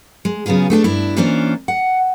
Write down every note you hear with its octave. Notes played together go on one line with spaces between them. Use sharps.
G#3
C#3 F#3 B3 F4 G#4
A3 D4 G#4 A4
G2 D4 E4
E3 A#3 C#4 D4 F4 C5
F#5